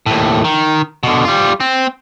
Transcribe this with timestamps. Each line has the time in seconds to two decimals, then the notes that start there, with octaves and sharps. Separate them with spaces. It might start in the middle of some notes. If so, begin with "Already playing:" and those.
0.06 D#2 A2
0.44 D#3
1.03 B2 D3
1.25 G3 F4
1.60 C4